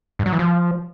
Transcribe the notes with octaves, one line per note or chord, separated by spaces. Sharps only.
G2
F#3
E3
F3